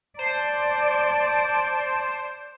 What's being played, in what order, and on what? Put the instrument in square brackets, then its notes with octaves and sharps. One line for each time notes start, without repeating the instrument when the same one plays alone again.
[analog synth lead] C5 [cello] D5 [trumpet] A5